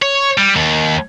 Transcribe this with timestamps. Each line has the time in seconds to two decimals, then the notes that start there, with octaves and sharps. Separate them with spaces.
0.02 C#5
0.38 G3
0.56 D#2